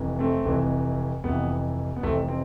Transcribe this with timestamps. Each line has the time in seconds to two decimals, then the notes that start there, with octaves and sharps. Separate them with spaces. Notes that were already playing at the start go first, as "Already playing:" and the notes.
Already playing: F1 F2 C3 E3
0.19 A3 C4
0.45 F1 F2 C3 E3
1.24 F1 F2 C3 E3 B3
1.96 B3
2.02 F1 F2 C3 E3 A3 C4
2.28 C4